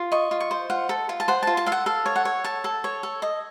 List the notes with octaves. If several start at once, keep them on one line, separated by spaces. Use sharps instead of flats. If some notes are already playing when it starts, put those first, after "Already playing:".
Already playing: F4
D#5 C#6
F4
C#6
C5
F4 F#5
A4
F4
A5
C5 F#5
F4 A5
A5
A4 F5
F#5
A4 F5
C#5
F#5
C#5
A4 A5
A4
C#5
A4
D#5